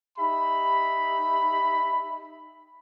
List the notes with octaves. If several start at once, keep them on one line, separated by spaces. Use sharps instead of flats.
D#4 G4 E5 B5